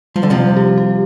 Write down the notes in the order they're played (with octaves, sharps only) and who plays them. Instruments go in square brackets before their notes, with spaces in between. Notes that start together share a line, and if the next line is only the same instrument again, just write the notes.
[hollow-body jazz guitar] F3 [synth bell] G3
[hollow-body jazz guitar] D3
C3 F3
[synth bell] G3
G4
G4